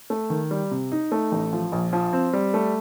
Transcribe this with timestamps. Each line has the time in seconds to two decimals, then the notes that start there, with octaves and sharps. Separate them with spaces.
0.10 A3
0.30 D#3
0.51 G3
0.71 C3
0.92 D#4
1.12 A3
1.32 A1
1.53 F3
1.72 A#1
1.93 F3
2.13 C4
2.33 G3
2.54 A3